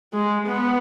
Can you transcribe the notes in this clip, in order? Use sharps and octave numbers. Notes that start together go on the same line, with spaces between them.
G#3
B3